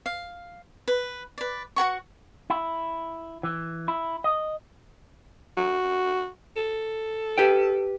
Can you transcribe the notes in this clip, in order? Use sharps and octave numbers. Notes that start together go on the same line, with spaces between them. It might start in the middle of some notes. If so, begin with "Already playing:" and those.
F5
B4
B4 D5
F#4 A#4 F#5 C#6
E4
E3
E4
D#5
F#4
A4
G4 B4 G5